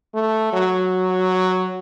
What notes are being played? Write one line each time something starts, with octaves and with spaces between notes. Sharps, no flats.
A3
F#3